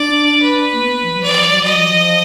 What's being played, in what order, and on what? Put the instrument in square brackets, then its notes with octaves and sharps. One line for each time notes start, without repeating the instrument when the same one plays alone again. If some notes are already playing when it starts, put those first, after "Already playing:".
Already playing: [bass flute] D4 [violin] D5
[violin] B4
[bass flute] A#3
B3
F3
F#3
[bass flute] F3 [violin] D5
[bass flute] F3
F#3
[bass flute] F#3 [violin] D#5
[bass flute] F3
F3